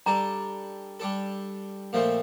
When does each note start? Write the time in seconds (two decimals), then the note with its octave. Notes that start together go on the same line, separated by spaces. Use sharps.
0.06 G3 D4 A4 A#5
1.00 G3 D4 A4
1.93 A#2 F3 A3 C4